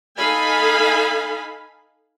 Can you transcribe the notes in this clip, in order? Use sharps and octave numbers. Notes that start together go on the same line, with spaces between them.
D#4 A4 F5 G#5 B5